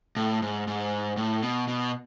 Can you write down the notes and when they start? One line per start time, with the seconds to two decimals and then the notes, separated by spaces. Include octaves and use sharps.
0.17 A2
0.42 G#2
0.67 G#2
1.17 A2
1.43 B2
1.68 B2